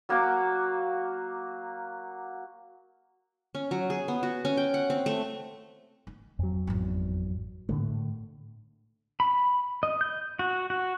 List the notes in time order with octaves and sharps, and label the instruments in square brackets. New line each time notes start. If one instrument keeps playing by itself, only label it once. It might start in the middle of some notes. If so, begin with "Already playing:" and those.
[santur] F#3 A#3 F#4 D6
[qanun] C#4
F#3
G#4
B3
F#4
C#4
G5
F#5
C4
A3
[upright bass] D#3
[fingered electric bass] F2 F#3
[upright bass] G#1 E2
[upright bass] G#1 [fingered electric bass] A2 D3 A3
[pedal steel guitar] B5
D#5
G6
F#4
F#4